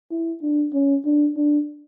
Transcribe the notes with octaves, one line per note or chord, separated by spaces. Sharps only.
E4
D4
C#4
D4
D4